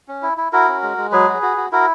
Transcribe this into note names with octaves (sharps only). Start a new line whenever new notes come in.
C#4
E4
E4
E4 F#4 A#4
C#4
G#3
G#3
F#3 G#4 B4
F#4
F#4
F#4
E4 F#4 A#4